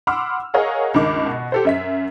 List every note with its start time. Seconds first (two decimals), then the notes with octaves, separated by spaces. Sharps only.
0.07 F#5 B5 C6 D6 E6 F6
0.54 G#4 A#4 C#5 D#5 F5 F#5
0.94 C#2 G2 D#3 D6
1.26 B2
1.52 G4 A4 C5
1.65 F#2 E5 B6